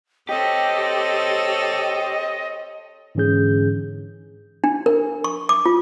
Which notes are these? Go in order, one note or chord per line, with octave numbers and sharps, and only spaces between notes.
C4 G4 A4 C#5 D#5
G#2 D3 E3 C#4 G#4 G6
D4
A#4
C#6
D6
F4